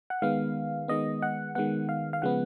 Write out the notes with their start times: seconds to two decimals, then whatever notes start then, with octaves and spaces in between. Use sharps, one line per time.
0.10 F#5
0.22 D#3 G#3 B3 F5
0.88 D#3 G#3 B3 D#5
1.22 F#5
1.55 D#3 G#3 B3 F#5
1.89 F5
2.13 F5
2.22 C#3 F3 G#3 B3 F#5